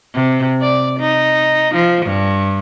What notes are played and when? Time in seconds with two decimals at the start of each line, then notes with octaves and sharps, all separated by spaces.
0.15 C3
0.62 D5
1.00 D#4
1.75 F3
2.06 G2